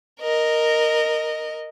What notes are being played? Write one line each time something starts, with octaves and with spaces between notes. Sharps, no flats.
A#4 D#5